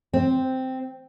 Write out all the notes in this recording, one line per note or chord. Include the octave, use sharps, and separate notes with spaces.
C4